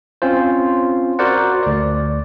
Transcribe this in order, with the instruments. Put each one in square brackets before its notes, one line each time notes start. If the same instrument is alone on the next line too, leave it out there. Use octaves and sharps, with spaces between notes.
[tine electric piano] C4 C#4 F4 C5
F#4 A#4 C5 D5 F#5
D2 D5